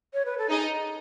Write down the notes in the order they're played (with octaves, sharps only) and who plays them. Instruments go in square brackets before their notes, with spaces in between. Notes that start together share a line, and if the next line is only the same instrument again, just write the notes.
[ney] C#5
B4
A4
[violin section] D#4 D#5 [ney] G#4